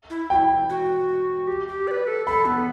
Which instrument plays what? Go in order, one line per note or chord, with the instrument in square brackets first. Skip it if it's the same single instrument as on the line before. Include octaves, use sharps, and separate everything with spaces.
[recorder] E4
[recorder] F#4 [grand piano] G5
[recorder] E4
F#4
G4
G4
D5
B4
A4
[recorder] A4 [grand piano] B5
[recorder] B3